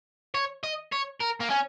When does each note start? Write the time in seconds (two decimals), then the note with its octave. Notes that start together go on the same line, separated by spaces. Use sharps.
0.35 C#5
0.64 D#5
0.93 C#5
1.21 A#4
1.41 A#3
1.51 C#4